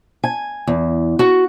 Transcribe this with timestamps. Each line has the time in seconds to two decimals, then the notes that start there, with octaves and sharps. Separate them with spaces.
0.24 G#5
0.67 E2
1.19 F#4